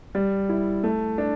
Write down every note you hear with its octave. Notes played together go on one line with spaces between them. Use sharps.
G3
E4
A3
D4